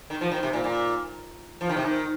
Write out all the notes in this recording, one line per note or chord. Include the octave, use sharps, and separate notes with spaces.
D#3
F3
D#3
C3
A#2
A#2
F3
D#3
C3
D#3